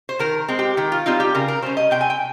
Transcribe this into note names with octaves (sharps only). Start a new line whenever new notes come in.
C5
D#3 A#4
G#3 C4
G4
D#3 G4
F4
G3 C4 D#4 F4
G4
C#3 A#4
A#4
G3 C#4 C5
D#5
C3 G5
G#5
G5